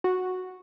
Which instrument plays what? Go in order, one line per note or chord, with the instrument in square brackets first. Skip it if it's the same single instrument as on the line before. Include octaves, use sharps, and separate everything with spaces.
[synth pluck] F#4